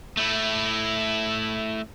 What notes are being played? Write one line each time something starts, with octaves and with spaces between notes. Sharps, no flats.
A3 E4